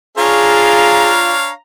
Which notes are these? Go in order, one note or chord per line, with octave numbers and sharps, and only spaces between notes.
D4 F4 G#4 C#5 F5 A#5